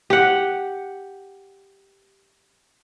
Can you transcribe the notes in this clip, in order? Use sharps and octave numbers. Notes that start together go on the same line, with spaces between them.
G4 F#5